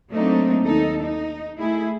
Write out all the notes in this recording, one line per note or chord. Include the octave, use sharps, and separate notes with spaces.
F#3 A3 A#3 C4 D4 D#4
D#2 D#4 A4
D#4
A3 E4 G#4